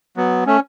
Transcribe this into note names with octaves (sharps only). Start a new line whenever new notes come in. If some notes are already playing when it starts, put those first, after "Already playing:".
F#3 B3
A3 C#4